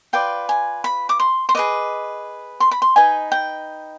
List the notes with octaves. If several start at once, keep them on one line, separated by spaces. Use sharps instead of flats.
F4 B4 D5 G5
G#5
B5
D6
C6
C6
G#4 B4 D#5 D6
C6
B5
C6
D#4 B4 D#5 G#5
G5